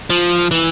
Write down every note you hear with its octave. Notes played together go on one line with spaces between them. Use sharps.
F3
E3